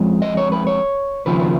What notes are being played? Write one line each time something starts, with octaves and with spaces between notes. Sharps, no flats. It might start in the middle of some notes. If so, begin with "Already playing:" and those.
Already playing: F2 F3 G#3 C#4
D#5
C#5
B4
C#5
D#2 C#3 F3 B4